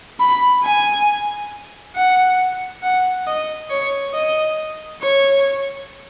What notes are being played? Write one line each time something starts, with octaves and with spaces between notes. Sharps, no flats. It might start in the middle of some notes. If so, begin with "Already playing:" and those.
B5
G#5
F#5
F#5
D#5
C#5
D#5
C#5